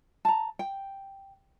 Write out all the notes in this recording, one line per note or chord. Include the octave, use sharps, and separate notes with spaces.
A5 A#5
G5